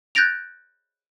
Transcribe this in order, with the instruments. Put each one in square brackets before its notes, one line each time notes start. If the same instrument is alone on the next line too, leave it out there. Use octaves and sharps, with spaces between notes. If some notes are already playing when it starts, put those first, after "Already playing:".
[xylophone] F#6 G6 A6 A#6 D7 F7